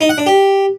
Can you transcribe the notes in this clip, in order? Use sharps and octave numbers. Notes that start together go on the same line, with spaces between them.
D#4
F#5
D4
G4